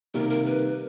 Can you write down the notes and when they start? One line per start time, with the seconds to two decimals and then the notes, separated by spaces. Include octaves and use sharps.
0.14 C3 D#3 G3 A#3 A#4
0.30 A#4
0.46 B4